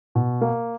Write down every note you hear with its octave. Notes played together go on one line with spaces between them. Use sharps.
B2
A#3